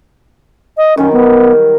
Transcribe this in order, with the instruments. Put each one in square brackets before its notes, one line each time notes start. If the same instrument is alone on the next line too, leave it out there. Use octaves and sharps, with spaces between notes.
[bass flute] D#5
[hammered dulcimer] D#3 F#3 G3 [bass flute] C#4
[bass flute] B3